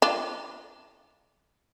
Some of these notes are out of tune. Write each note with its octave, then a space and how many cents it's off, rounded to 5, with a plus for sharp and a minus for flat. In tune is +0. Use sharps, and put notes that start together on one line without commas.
D4 +0 F4 -25